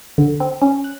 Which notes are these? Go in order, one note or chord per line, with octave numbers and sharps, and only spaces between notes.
D3
C4
C#4
F#6